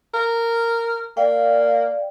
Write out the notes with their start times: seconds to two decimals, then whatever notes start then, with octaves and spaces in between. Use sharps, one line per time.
0.14 A#4
1.17 A#3 D5 F5 G5